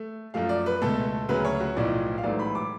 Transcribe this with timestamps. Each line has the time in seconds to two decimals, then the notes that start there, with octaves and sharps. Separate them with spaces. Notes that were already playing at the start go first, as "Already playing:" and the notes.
Already playing: A3
0.34 F#2 F3 A3 F5
0.49 D5
0.66 B4
0.82 C#2 B2 A3 A4
1.29 D2 C#3 F#3 B4
1.45 C#5
1.60 F#4
1.76 B1 A2 F3 D5
2.18 F5
2.23 A1 G#2 F#3 A3 D5
2.39 B5
2.55 D6